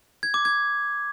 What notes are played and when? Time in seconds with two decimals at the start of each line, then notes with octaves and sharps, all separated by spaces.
0.23 G#6
0.34 D6
0.45 G#6